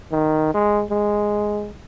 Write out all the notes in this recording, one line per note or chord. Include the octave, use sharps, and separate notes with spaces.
D#3
G#3
G#3